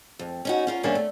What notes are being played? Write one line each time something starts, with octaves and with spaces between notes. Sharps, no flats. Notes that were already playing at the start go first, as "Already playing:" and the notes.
F2
C#4 D#4 F#4
C#4 F4 A#4
E2 G2 D#3 A#3 C#4 D4
A3